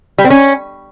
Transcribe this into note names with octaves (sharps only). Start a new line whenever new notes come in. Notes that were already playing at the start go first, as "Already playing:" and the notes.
G3
C4
C#4